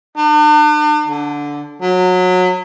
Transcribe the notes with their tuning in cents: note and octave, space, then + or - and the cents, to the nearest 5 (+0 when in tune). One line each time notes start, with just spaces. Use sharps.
D4 +40
D3 -10
F#3 -20